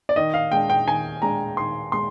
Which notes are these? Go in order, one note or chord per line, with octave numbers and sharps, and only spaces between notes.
D5
D#3 D#5
F5
G#3 D4 G5
G5
D#3 G#5
G#3 D4 A#5
D#3 C6
G#3 C6